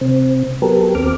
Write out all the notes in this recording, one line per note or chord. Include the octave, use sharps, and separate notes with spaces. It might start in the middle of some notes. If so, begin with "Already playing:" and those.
C3 C4
F#3 B3 G4 A4 A#4
D#2 C4 D6 F6